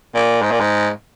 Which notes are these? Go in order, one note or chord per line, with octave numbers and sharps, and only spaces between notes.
A#2
G#2
A#2
G#2